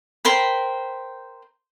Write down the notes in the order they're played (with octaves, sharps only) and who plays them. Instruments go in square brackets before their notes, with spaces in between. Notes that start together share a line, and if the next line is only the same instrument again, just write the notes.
[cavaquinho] A#4 C5 G5 B5